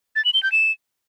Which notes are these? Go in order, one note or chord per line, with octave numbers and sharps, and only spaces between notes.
A6
F#7
G7
G6
E7